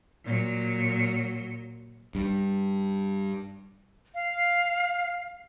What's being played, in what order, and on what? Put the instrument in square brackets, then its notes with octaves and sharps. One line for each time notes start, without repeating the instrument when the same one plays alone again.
[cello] A#2 F#3
[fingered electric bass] G2
[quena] F5